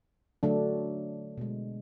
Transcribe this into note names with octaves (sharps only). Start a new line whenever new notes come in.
D3 F#3 A3 D4
B2 G#3